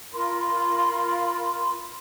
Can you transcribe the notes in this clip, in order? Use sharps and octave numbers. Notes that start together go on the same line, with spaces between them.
F4 A#4 B5 C6